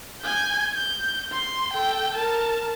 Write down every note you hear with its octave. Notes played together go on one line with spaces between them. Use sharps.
G#5 G6
G6
C6
A4 G5
A#4 A5